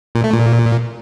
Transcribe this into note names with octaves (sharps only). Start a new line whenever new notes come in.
A#2
A3
A#2